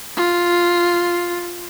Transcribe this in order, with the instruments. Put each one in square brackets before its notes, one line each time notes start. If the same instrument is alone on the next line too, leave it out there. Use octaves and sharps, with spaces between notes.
[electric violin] F4